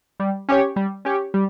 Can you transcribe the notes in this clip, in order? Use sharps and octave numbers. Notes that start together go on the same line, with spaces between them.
G3
C#4 G4 C#5
G3
C#4 G4 C#5
G3